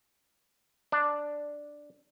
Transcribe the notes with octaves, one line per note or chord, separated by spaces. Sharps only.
D4